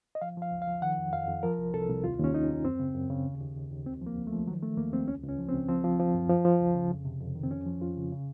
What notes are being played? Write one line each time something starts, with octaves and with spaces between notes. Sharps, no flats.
D#5
F3 F5
F3 F5
C#2
F5
F3
D#3 F#5
F2
F2 F5
F2
F3 A#4
C2
C2 A4
C2
D#2 F4
D#2
C#4
D#2 D#4
D#2
F#2 C4
C#3
F#2
C#3
D#2
D#2
D#2
D#2
C#2 C4
F3 A#3
C#2
A3
F3
D#3 F#3
D#3 A3
D#2 A#3
D#2 C4
C#2 C#4
C#2
C#4
F3
C4
C#2
F3 C4
F3
F3
F#2
F3
F3
C#2
C#3
F2
C3
F2
D#3
C4
F2 C#4
F3
F2 F4
C#3
C#3